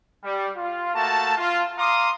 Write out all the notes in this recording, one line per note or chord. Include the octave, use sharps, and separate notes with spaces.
G3
F4
A3 A#3 F#4 A5
F4
F5 A#5 C6 D6 D#6